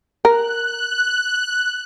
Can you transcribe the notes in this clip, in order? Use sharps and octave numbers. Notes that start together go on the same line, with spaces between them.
A#4 F#6